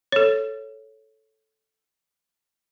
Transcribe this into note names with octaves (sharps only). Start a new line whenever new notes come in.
A4 C#5